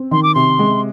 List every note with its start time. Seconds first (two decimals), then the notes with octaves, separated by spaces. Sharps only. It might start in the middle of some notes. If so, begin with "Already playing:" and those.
Already playing: C4
0.11 D#3 C6
0.23 D6
0.35 C3 C6
0.59 G#3